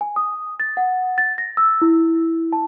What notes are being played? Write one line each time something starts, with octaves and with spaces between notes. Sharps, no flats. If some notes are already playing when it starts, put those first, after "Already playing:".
G#5
D#6
A6
F#5
A6
A#6
E6
E4
A5